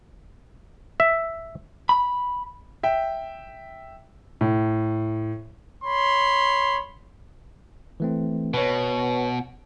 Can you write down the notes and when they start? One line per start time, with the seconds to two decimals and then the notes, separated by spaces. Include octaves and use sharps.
1.00 E5
1.89 B5
2.83 E5 G5
4.41 A2
5.84 C#5 B5 C6
8.00 E3 A3 C4
8.54 B2 B4 C#5